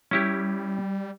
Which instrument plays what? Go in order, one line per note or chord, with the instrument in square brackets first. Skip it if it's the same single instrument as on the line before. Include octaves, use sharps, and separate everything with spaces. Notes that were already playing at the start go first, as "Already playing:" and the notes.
[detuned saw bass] G3 [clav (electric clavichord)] C#4 E4 G4